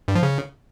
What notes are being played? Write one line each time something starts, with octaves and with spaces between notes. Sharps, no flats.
G2
F3
C#3